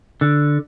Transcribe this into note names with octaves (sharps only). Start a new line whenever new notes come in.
D3